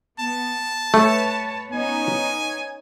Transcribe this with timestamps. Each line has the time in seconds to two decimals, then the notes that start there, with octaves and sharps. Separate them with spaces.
0.20 B3 A5
0.94 A3 B4 C#5
1.73 B3 C#4 D#4 G#5